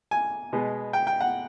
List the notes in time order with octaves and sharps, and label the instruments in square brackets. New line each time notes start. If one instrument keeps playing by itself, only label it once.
[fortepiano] G#5
B2 G#3 B3
G5
G5
F#5